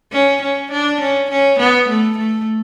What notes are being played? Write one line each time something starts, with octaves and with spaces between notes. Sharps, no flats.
C#4
C#4
D4
C#4
C#4
B3
A3
A3